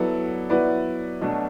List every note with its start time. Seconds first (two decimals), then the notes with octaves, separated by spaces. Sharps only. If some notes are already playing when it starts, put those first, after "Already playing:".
Already playing: F#3 B3 E4 A4 D5
0.50 F#3 B3 E4 B4 D5
1.21 B2 F#3 A3 D4